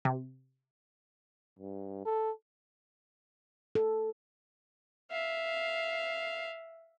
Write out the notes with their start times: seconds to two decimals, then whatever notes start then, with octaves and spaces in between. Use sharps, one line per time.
0.05 C3
1.59 G2
2.06 A4
3.75 A4
5.11 E5 F5